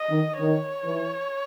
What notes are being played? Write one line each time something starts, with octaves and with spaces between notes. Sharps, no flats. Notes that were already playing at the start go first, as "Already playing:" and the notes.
Already playing: D#5
D#3
D#3 C#5
E3